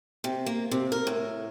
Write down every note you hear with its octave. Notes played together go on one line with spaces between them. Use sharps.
C3
A#3
C3
A#4
A2